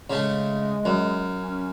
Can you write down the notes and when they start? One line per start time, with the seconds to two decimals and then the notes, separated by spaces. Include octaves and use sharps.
0.10 C#3 G#3 A3
0.85 F#2
1.39 C#4